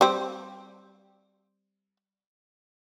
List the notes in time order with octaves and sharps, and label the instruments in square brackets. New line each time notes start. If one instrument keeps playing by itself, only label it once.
[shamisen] G3 C4